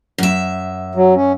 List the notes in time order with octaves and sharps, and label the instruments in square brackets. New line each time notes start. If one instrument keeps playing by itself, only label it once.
[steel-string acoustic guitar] F#2 E5
[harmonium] F#3
C#4